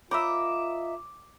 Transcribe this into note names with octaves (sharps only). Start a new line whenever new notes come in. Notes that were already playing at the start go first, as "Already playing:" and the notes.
F4 A#4 C#5 D#5 E5 B5 D6 E6